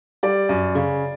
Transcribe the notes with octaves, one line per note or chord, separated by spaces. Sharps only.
G3 D5
F#2
C#3